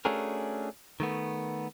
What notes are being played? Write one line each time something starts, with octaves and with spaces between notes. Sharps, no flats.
A3 C#4 D4 F#4 G#4 A#4
D#3 A3 B3